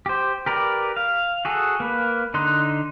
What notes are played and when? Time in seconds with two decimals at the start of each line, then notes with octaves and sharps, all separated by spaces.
0.06 G4 C5
0.46 G4 A#4 B4 D5
0.97 F5
1.45 F#4 G#4 A4
1.80 A#3 B4
2.34 D3 D#4 C6 F#6